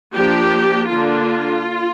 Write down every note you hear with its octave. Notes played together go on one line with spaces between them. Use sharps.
F3 A#3 D4 G4
D3 A#3 D4 F4